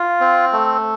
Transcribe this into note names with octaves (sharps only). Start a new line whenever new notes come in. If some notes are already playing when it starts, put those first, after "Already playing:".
Already playing: F4
C4
A3